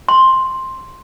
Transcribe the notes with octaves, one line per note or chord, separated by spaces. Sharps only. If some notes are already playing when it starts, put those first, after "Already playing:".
C6